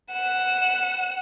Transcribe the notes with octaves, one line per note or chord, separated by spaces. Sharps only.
F#5 E7